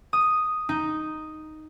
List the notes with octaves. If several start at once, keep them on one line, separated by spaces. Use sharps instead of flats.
D#6
D#4